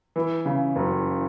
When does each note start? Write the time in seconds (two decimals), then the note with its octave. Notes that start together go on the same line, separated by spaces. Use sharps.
0.16 E3
0.45 C#3
0.76 F#1